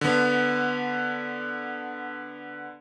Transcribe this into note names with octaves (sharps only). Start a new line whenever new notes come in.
D3 B3